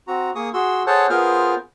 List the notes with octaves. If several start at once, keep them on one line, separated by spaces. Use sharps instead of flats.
C4 F#4 A#5
A#3 G#4 C#6 D#6
F#4 G#4 C6 E6
G#4 A4 C5 C#5 F#5 A5
B3 F4 G#4 A#4 C5 F6